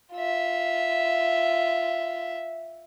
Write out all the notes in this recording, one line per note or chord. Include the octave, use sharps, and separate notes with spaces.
F4 E5